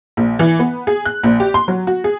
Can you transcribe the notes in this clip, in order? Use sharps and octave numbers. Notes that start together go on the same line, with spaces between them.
A#1
E3
B3
G#4
F#6
A#1
G4
C6
F#3
F#4
G#4